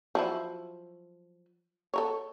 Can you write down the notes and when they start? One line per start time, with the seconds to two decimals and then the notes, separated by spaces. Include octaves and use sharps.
0.15 F3 F#3 E4
1.94 A4 A#4 C#5